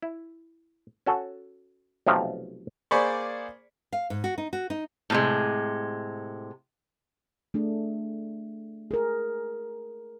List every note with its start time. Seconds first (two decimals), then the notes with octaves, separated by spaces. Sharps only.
0.02 E4
1.06 C#4 F#4 A4
2.06 B1 C3 F3 A3 F5 A#5
2.91 A#3 G#4 C5 D5 B5 C#6
3.92 F5
4.10 G#2
4.24 F#4
4.38 D#4
4.53 F#4
4.70 D#4
5.10 A2 C3 G#3
7.54 A3 D4 G#4
8.91 G#4 A#4